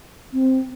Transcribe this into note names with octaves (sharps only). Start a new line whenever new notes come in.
C4